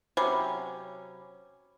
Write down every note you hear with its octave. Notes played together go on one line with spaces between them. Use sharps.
C3 F#3 C#4 C5 B5 D6